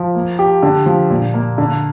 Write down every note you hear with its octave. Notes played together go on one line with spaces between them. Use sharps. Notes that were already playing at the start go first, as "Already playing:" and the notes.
Already playing: F3
A#3
G4
D3
F3
A#2
A#3
D3